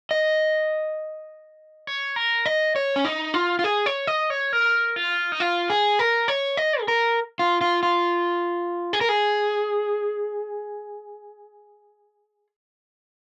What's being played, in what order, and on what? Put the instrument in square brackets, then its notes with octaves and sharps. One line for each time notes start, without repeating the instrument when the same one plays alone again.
[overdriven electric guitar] D#5
C#5
A#4
D#5
C#5
C#4
D#4
F4
F4
G#4
C#5
D#5
C#5
A#4
F4
D#4
F4
G#4
A#4
C#5
D#5
G#4
A#4
F4
F4
F4
G#4
A#4
G#4